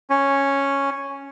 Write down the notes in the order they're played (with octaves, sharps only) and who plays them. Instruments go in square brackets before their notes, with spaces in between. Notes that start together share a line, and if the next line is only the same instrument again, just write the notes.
[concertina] C#4